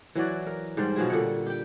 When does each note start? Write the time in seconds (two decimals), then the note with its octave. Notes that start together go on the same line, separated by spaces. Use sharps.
0.15 E3 F#3 F#4 D5
0.47 A#4
0.77 G#2 G3 C5 D5
0.96 B2 F3 F#3 G#4
1.10 A#2 D3 G3 F#5
1.46 G4 G5